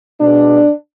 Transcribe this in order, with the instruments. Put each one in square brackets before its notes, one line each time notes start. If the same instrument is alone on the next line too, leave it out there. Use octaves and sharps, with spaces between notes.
[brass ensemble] B2 G#3 B3 D4